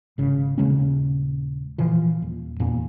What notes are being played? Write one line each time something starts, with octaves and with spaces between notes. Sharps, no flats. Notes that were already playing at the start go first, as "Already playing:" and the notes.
G#1 C#3
D#1 C#3 G#3 C#4
A#2 E3 F3
D#1
E2 A#2